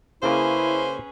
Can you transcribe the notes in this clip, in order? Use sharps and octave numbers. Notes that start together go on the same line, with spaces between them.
C#3 A#3 C#4 E4 G#4 B4 C5